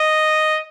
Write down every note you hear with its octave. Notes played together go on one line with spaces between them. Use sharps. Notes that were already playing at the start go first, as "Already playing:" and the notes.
Already playing: D#5